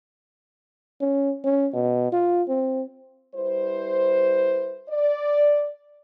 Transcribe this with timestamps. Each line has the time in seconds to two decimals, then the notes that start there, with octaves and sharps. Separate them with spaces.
1.01 C#4
1.44 C#4
1.73 B2
2.12 F4
2.48 C4
3.35 G3 E4 B4 C5
4.89 D5